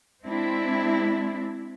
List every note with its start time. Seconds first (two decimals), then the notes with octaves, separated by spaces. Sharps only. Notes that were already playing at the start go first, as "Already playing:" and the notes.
0.24 G#3 C4 D4 E4